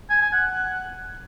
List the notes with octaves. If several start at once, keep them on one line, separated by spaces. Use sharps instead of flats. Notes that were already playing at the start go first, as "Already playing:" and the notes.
G#5
G#5
F#5